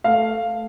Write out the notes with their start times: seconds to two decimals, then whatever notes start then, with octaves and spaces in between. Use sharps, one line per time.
0.04 A3 F5